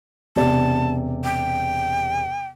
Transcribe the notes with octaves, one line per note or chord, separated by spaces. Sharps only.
E1 C3 D5 A5
G5